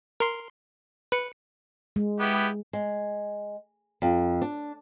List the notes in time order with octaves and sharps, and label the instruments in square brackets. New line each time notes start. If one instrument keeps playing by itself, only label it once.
[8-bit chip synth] A#4 C6
B4 C#7
[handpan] G#3
[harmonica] B3 E4 G4
[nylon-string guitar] G#3
F2
D4